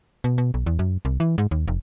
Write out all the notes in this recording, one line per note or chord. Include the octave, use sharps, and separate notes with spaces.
B2
B2
B1
E2
F#2
C2
E3
G#2
D#2
F1